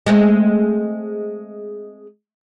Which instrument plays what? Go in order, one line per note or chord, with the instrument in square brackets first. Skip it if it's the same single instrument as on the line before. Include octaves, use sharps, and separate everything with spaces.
[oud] G#3 A3 C4